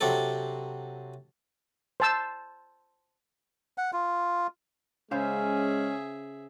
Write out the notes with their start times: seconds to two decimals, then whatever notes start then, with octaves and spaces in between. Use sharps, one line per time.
0.01 C3 F#3 C4 D4 A4
2.00 C5 A5 E6
3.78 F#5
3.93 F4
5.11 C#3 G#3 C#4 G#4 C5 E5 F5